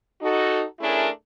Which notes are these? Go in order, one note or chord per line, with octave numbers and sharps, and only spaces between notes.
D#4 F#4 A4
A3 C#4 D4 E4 G#4 A#4